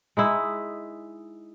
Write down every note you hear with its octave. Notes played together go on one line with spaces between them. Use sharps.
G#3 D#4 E4